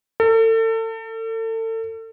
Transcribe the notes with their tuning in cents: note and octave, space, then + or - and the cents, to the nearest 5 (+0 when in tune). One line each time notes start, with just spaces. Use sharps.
A4 +35